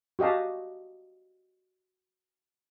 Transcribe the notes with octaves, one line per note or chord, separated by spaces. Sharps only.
F#4 G4 D#5 F5 A5